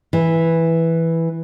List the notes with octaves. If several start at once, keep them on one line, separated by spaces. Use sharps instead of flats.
E3